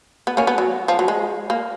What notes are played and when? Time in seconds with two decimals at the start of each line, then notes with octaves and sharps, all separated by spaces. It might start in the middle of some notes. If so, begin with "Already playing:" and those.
0.27 B3
0.37 A#3 C#4
0.47 B3
0.58 F#3
0.88 F3
0.99 F#3
1.08 G#3
1.50 A#3